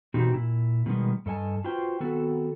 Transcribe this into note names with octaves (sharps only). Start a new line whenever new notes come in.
B2 E3 C4 D#4 F#4 G4
A#2 E4
B2 D#3 G3 G#3 B3
G2 A4 D#5 G#5 A5
F4 F#4 B4 C5 G5
D#3 B3 C4 F#4 A4